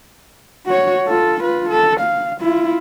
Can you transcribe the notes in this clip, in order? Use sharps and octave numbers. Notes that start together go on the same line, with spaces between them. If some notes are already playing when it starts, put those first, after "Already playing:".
F#4 C#5
F4 A4
F4 B4
A4
F5
E4 F4